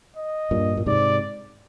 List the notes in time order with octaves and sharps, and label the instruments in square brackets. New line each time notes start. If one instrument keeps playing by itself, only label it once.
[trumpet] D#5
[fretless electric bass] G2 A#2
A#2
[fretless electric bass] G#2 C3 [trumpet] D5